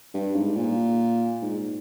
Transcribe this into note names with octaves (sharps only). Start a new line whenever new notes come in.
G2
G#2
A#2
G#2